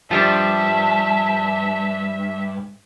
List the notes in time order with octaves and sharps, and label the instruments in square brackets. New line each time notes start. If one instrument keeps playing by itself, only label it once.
[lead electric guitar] G2 [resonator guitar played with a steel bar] F3 G3 D4 [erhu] E5 [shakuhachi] A5